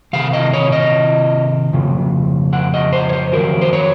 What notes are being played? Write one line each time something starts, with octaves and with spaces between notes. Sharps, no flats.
C3 D#3 F5
D#5
C#5
D#5
F2 C#3
F#5
D#5
C5
C#5
C5
F2 D#3 F#3 A#4
C5
C#5